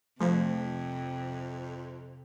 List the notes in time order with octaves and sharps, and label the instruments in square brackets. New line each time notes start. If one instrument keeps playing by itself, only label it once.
[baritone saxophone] F2 [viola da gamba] C3 [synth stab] F3 [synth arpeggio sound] A3 F4 F5